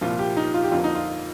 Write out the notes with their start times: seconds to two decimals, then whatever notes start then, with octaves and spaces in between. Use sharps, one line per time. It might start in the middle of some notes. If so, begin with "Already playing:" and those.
0.01 C2 A#2 F3 F4
0.19 G4
0.37 D#4
0.54 F4
0.63 G4
0.72 F2 D3 F3 A#3 F4
0.84 D#4
0.95 F4